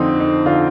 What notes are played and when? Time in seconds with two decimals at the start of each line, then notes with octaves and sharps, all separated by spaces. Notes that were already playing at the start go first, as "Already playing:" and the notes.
Already playing: F2 D3 C4 D#4
0.20 D#4
0.46 D3 F4